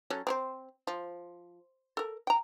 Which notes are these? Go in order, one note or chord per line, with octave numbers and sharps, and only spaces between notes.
F#3 C#4 A4
C4 A#4 C5
F3
A4 A#4
G5 A#5